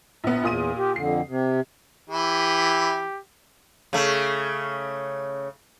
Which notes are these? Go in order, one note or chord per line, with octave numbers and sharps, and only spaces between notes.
A#1 B3
E2 A#2 D#6 D#7
G4
F2 D3 C7
C3
E3 G4
C#3 A3